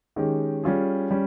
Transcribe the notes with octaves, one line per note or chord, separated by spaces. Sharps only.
D#3 G#3 C#4 G4
G3 C#4 F4 G#4
G3 C#4